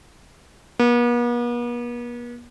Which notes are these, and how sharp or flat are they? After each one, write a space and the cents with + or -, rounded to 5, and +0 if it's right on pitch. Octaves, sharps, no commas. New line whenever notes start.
B3 -45